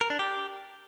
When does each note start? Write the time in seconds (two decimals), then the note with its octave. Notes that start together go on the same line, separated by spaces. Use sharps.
0.01 A#4
0.10 D4
0.19 G4